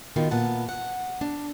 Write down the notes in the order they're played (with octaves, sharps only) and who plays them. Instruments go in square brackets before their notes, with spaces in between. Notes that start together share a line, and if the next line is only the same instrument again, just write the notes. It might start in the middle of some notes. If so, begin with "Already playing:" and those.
[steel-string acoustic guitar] B2 D#3 F4
A#2 B3 F#5 A5
F#5
D4